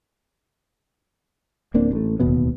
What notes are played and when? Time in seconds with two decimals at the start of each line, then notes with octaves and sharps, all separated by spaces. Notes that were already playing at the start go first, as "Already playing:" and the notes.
1.74 D1 A#3 C4 D4
1.92 A1 A3
2.19 D1 D#2 B2 B3